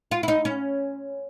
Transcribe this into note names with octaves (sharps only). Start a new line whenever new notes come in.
F4
E4
D#4
C#4